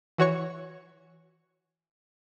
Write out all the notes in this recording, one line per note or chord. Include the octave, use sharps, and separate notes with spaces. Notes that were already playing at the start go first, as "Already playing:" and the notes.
E3 F#4 C#5 C#6